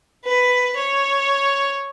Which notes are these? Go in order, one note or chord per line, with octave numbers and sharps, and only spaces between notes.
B4
C#5